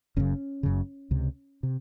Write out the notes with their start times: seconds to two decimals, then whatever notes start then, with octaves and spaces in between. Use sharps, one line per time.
0.16 F#1 F#2 C#3 C#4
0.63 F#1 F#2 C#3
1.11 C#2 C3
1.63 C3